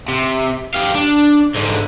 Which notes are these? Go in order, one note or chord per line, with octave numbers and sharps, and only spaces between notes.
C3
G4 F5
D4
G#2 D3